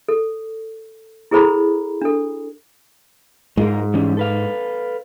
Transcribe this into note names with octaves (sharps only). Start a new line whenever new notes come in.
A4
E4 G#4 A4 C5 A#5 B5
D4 A4
G#2 G#3 F4 A#4
E3 G3 C#4
A4 B4 F5